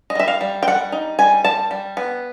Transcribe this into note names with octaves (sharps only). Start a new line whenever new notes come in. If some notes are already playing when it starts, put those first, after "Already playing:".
D#5
G3 E5
F5
G3
G5
G3 F#5
D#4
G3 G#5
G3 A5
G3
B3